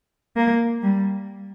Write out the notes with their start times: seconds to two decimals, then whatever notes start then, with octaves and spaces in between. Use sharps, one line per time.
0.36 A#3
0.82 G3